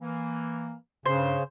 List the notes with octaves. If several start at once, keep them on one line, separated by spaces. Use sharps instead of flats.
E3 A#3
G2 C#3 C5